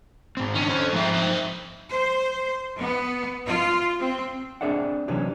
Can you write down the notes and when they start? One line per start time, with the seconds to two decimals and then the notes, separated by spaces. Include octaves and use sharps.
0.37 G#2 C4
0.56 D#3 C#4 D4
0.69 A4 C5
0.93 G#2 F3 C4 D#4 E5
1.14 C4 D#5
1.91 C5
2.78 B3
3.48 F4
3.99 C4
4.61 C4 D4 G#4 D5 E5 F#5
5.08 C3 E3 F#3 C#4 D4 G4